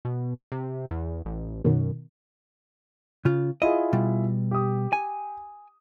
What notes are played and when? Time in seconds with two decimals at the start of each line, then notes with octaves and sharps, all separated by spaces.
0.05 B2
0.52 C3
0.91 E2
1.25 A1
1.64 F#2 B2 D#3
3.25 C#3 F4
3.62 E4 F4 G#4 D#5
3.93 B2 G3
4.51 G4 D#6
4.93 G#5